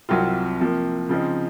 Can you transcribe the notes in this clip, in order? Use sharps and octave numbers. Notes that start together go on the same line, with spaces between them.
C2 C3 F#3 C4 F4
C3 F3 A#3
C#3 F3 C4 D#4